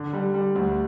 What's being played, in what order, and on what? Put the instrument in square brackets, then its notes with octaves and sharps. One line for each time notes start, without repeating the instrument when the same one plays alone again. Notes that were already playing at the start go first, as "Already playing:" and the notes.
Already playing: [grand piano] D3
G3
G3
D2